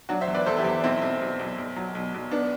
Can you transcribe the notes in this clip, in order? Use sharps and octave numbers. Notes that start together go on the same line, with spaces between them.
F#3 D4 F#4
C5 E5
E2
B4 D5
E2 A4 C5
E4 G4
E2
B1 C4 E4
B1
B1
B1
B1
F#3
B1
B1
B3 D4